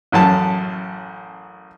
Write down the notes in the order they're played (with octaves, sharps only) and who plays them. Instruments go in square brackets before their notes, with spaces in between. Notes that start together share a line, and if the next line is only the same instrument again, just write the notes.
[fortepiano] A1 F#2 A5